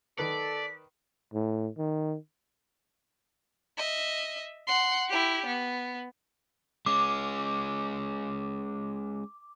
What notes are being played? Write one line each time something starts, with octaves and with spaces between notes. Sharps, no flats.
D#3 A4 B4 D5 B6
A2
D#3
D#5 E5
F#5 C6
E4 G4
B3
G#3 C#4 D6